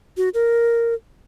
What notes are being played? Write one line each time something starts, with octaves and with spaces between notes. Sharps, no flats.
F#4
A#4